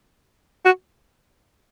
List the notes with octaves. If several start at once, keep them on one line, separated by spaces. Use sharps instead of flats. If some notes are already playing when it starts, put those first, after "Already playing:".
F#4